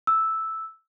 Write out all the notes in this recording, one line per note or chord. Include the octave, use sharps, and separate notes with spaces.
E6